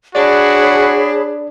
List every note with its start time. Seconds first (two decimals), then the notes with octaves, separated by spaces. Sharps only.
0.15 D4 F#4 G#4 C#5 D5 B5